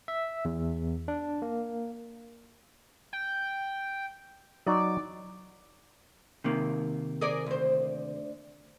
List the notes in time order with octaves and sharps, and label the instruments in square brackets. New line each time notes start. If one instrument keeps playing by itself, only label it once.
[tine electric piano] E5
E2
D4
A#3
[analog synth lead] G5
[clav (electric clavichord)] F#3 D#4 [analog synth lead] D5
[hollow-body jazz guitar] C3 D#3 A#3
[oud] G#4 A#4 D5
D2 C5